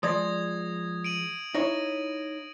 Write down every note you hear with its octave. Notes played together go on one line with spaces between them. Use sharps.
F3 G#3 D5 D#6 G#6 A#6
D7 D#7 F#7
D#4 E4 C#5 A#6